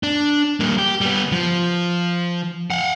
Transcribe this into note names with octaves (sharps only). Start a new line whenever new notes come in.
D4
G3 A#3
G4
G3 B3
F3
F5 F#5